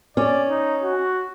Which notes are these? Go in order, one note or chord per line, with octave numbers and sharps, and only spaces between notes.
C#4 D5
D#4
F#4